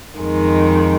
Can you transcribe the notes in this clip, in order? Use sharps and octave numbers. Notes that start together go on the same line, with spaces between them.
F2 D#3 G#3